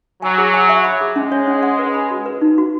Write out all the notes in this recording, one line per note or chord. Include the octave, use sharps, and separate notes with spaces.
F#3 G#5
G#4
G#5
E5
B5
G#4
G#3 C#4
C#5
C#4
F#5
B4
B5
F#4
B4
D#4
F#4